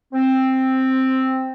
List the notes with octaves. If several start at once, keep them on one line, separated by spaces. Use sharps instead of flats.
C4